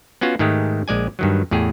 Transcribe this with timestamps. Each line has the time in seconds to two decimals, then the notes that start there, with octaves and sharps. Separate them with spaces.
0.21 B3 C#4 F4 F#4
0.39 G#2 D#3 G#3 A3 G4
0.88 A#1 G#3 D5 G#5
1.19 G2 D#3 F#3
1.51 E2 A2 G4 G#4